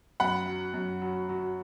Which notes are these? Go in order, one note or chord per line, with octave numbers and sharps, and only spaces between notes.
F#2 F#5 B5
F#3
F#2
F#3
F#3